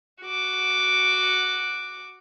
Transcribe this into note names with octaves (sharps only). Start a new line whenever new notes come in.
F#4 D6